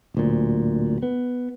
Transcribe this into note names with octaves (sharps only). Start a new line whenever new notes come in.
D1 D2 A#2
B3